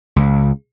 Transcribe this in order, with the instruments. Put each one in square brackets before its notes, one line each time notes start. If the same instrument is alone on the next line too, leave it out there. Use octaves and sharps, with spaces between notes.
[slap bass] C#2